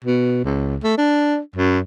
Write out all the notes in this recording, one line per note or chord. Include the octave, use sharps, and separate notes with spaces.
B2
C#2
A3
D4
F#2